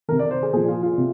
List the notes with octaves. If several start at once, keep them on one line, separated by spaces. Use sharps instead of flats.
C3 D#3 A#4
D5
C5
G#4
A#2 F3 G#4
F4
F4
C3